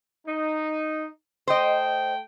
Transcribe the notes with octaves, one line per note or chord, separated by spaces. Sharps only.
D#4
A3 C5 D#5 G5